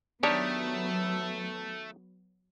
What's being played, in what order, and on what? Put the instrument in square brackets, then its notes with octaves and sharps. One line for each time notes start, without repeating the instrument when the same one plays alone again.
[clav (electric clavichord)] D#3 G4 C#5 [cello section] F#3 B3 [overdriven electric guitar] A3 [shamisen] D4